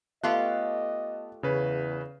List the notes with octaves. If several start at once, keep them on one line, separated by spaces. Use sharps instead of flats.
A3 B3 F4 G4 D#5 A5 F#6
E2 C#3 B4 C#5